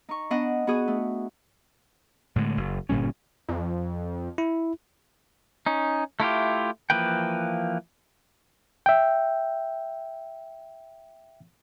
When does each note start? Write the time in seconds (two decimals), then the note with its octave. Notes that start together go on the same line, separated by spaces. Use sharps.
0.09 D#4 C#6
0.30 B3 D4 D#5 F#5
0.67 B3 F#4 G#4 D#6
0.88 A3
2.36 A2 D3 G#3
2.57 F#1
2.89 G1 A#2 G3 C#4
3.49 F2
4.38 E4
5.66 C#4 D#4
6.20 A3 E4 F4 G4
6.90 E3 F3 A#3 B4 G5
8.86 E5 G5